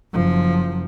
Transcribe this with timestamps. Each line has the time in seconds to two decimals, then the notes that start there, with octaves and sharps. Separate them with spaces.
0.13 F#1 F3